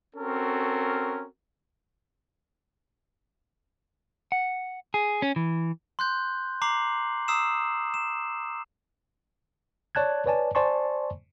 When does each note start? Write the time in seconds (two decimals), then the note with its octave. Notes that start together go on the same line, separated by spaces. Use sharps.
0.16 C4 C#4 F#4 A4 A#4
4.32 F#5
4.94 G#4
5.22 C#4
5.36 E3
5.99 C6 F#6 G6
6.62 A#5 D6 C7 F#7
7.28 A#5 D#6 E6 C7 E7
7.94 E7
9.95 C#5 D5 A5 F#6 G#6
10.26 B4 C#5 D5 G#5 A5
10.55 C5 D5 G#5 A5 C6 C#6